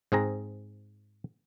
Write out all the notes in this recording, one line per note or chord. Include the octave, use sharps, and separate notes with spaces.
G#2 C4 G#4 A#5